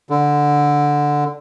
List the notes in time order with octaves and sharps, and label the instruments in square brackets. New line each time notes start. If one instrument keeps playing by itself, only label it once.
[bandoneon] D3